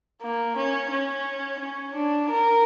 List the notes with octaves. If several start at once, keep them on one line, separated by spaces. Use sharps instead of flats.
A#3
C#4
C#4
C#4
D4
A#4